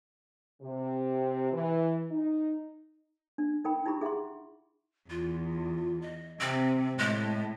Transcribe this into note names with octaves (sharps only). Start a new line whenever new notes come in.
C3
E3
D#4
D4
D#4 A#4 G5 B5
D#4 E4 G4 B5 C#6
G#4 E5 F#5 A#5 C6
E2 F4
D#5
C3 C4
A2 G#3